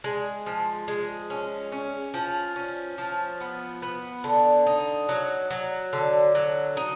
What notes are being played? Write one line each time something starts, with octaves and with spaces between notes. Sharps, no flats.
G#3
F3
G#3
C#4
C#4
F3
C#4
F3
B3
B3
D3
D#4
F#3
F#3
D3
F#3
D#4